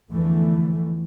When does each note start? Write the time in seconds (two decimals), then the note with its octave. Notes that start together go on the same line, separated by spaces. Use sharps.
0.11 E2 D3 E3 F3 A3